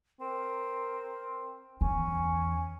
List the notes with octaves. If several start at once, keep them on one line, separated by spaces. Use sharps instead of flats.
C4 A#4
E2 C#4 G#5